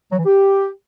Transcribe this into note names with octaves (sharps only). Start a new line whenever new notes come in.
F#3
E3
G4